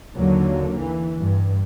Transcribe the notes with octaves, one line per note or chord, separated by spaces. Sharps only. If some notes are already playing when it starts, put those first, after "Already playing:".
D#2 D3 F#3 A#3
E3
G2